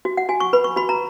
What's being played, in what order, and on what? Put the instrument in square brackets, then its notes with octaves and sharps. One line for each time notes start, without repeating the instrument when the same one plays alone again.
[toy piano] F#4
F#5
F#4 G#5
C#6
B4 B5
C#6
F#4 B5
A#5